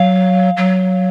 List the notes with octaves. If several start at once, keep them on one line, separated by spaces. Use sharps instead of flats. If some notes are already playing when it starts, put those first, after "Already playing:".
Already playing: F#3 F5
F#3